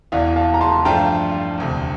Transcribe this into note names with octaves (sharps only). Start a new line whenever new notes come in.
E1 E2 E3 D5 F5
F5 A5
A#5
A5 C6
G2 F3 A3 D4 F4 G5 A#5
E1 D2 C3